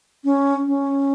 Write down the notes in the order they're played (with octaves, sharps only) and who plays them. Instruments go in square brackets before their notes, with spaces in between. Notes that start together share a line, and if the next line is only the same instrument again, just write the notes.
[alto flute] C#4
C#4